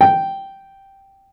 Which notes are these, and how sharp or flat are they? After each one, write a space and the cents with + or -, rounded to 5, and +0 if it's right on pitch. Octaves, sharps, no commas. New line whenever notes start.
G5 -5